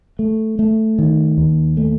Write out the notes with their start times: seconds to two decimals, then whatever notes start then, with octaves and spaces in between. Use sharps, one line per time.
0.19 A3
0.59 A3
0.99 D#3
1.38 D#2
1.77 A3